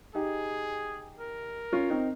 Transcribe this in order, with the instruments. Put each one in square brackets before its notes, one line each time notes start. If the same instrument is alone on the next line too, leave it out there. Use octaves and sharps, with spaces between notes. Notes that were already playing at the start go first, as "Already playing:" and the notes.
[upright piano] D#4 G4 [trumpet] G#4
[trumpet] A#4
[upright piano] C#4 F4
C4 D#4